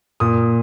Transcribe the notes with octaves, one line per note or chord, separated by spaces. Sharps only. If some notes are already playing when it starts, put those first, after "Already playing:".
A#2 D#6